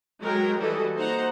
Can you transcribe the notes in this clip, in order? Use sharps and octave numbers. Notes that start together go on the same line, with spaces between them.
F#3 G#3 A#4 G5
E3 G3 F#4 A4 D#5
A#3 D#4 C5 F#5 A#5